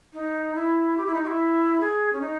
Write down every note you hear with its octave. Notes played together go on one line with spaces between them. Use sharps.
D#4
E4
G4
E4
D#4
G4
E4
G#4
C#4
D#4